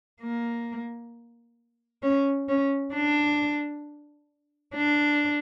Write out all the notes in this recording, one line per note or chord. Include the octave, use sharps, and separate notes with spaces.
A#3
C#4
C#4
D4
D4